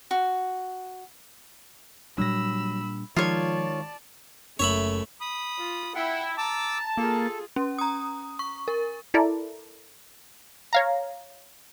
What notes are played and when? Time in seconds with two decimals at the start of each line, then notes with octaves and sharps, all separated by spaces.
0.11 F#4
2.18 A#2 F#3 G3 D4 B5 E6 A#6
3.16 D#3 F3 G#3 F4 C#5 D5 A5
4.59 F#1 A3 C#5 E5 B5
5.21 B5 D#6
5.58 F4
5.95 E4 F#5 G5
6.38 A5 A#5 D6 E6
6.97 A#3 F4 G#4 A4
7.56 C#4
7.78 A#5 D#6
8.39 C#6
8.68 A#4
9.14 E4 A4 A#4 D5
10.73 C#5 F5 A#5